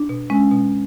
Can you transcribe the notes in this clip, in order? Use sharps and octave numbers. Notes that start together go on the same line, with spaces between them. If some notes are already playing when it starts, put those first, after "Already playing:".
Already playing: D4
B2
G#3 C#4
B2